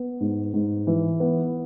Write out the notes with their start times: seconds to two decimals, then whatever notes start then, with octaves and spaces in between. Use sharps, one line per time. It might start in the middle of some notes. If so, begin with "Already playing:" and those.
Already playing: B3
0.20 G#2
0.53 G#2
0.87 E3
1.20 B3